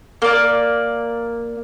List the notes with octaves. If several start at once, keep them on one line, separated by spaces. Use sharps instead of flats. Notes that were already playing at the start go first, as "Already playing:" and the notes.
A#3 D5